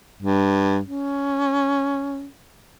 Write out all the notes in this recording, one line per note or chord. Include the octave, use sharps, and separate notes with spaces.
G2
C#4